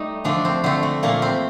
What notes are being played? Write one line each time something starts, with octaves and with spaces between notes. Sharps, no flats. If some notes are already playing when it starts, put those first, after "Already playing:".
Already playing: G3 A3 D#4
D3 F3 A3 D4
C4
D3 A3 C4
A3
A#2 A3 A#3
C4